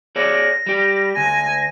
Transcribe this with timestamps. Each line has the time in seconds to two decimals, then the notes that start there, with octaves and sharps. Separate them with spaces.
0.16 G#4 C#5 D5 A#6
0.67 G3 G4
1.17 D2 G#5